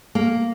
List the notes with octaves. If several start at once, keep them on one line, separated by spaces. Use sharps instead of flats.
A#3